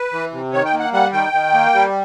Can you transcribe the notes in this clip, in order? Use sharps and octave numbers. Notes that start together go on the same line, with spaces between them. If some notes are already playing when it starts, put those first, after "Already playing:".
Already playing: B4
E3
C3
D#3 C#5
G5
A#3
F#5
G3 F#5
D#3 G5
D#3
A#3
G3